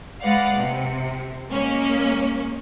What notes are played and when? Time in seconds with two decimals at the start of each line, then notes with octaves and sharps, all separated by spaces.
0.22 G#3 B4 D5 F5 F#5
0.55 C3
1.51 G#3 A#3 C#4